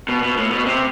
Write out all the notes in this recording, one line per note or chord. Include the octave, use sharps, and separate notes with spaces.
B2
B2
A2
B2
C3